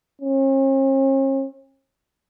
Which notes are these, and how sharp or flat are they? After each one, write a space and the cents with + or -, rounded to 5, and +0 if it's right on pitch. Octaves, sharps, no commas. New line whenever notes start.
C#4 -45